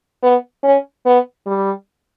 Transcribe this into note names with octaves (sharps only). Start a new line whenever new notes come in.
B3
C#4
B3
G3